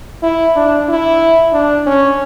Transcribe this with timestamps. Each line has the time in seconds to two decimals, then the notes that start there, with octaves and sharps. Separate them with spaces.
0.23 E4
0.56 D4
0.89 E4
1.53 D4
1.86 C#4